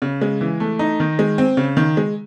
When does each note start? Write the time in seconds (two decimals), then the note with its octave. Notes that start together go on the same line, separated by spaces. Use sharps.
0.02 C#3
0.21 G#3
0.41 E3
0.60 A3
0.79 D#4
1.00 D#3
1.19 G#3
1.38 C4
1.57 C#3
1.77 D#3
1.97 G#3